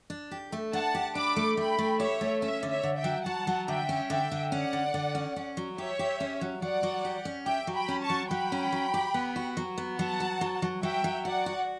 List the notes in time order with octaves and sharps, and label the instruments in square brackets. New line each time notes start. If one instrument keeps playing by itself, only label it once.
[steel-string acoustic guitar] D4
G4
A3
[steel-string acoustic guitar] D4 [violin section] F#5 A5
[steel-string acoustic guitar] G4
[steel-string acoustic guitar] D4 [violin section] B5 D6
[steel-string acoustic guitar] A3
[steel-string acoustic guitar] A3 [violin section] G5 B5
[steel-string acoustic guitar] A3
[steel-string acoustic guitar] G4 [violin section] C#5 E5
[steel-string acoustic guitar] A3
[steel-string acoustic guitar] C#4 [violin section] C#5 E5
[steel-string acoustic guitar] D3
[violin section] C#5 E5
[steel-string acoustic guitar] D3
[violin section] E5 G5
[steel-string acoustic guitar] F#3
[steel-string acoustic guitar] F#3 [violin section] F#5 A5
[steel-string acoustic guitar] F#3
[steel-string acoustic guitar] D3 [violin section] E5 G5
[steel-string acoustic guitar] C#4
[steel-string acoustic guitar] D3 [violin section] E5 G5
[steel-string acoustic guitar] D3
[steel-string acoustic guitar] C#4 [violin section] D5 F#5
[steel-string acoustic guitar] D3
D3
C#4
C#4
F#3
[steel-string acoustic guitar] G4 [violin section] C#5 E5
[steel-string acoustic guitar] G4
C#4
F#3
[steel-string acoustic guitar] F#3 [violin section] D5 F#5
[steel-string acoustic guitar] F#3
G4
C#4
[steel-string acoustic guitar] G4 [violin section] E5 G5
[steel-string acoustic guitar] F#3
[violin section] G5 B5
[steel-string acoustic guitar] C#4
[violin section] A5 C#6
[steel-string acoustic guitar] F#3
[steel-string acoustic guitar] F#3 [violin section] G5 B5
[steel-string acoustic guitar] C#4
F#3
G4
B3
F#4
F#3
B3
[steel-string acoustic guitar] F#3 [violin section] F#5 A5
[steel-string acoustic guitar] F#4
F#3
F#3
[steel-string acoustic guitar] F#3 [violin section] E5 G5
[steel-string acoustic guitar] F#3
[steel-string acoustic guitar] F#4 [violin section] D5 F#5
[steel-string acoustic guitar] F#4